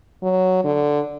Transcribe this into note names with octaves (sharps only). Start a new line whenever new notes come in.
F#3
D3